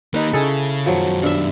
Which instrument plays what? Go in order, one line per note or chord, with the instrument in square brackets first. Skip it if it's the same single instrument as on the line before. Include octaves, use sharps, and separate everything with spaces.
[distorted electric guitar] D#3 A#3 [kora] D#4 B4
[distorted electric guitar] C#3 [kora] E4 G#4 A4
[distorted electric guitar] F#2 D#3 [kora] F3 F#3
[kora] G2 E5